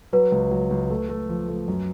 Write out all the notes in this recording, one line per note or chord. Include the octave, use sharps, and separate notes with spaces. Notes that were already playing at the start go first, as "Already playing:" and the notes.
F#3 B4
C#2
F#3
C#2
A3
A3
F3
A3
F#2